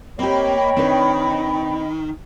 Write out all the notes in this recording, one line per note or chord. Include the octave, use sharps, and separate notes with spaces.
A#3 C4 G4 C#5 D#5 G5 B5
D#3 C4 D4 B4